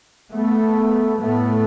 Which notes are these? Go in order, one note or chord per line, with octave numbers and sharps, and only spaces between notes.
A3 B3
A2 A3 B3